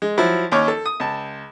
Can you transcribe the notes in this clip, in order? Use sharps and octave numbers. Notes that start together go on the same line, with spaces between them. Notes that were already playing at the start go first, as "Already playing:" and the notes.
G#3
F3 F#3 E4
D#2 C#4 C#5 D6 F6
A4
D#6
C#2 A5